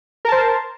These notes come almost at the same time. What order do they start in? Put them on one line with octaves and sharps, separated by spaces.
A#4 A5 C5